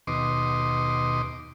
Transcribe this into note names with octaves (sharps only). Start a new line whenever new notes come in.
D#2 B2 D#5 C6 D6